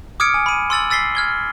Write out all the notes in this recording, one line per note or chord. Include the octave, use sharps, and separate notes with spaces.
D6 D#6 F6 G#6 C#7 D7
G#5
B5 D#7
C6 E6 A6 F#7
E6 A6 B6 C7 G7
F6 G#6 G7